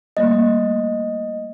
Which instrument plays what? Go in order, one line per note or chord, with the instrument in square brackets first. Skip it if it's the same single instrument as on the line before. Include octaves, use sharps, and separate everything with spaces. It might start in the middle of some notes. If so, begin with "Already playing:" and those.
[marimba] G3 A3 A#3 [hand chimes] D#5